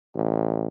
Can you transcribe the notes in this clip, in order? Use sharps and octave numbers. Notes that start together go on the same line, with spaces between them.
A1